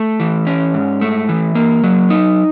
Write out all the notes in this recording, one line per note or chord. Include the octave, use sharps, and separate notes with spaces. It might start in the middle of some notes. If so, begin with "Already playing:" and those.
Already playing: A3
E3
C#4
G#2
A3
E3
A#3
F#3
D#4